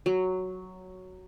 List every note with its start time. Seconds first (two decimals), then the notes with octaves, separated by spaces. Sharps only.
0.06 F#3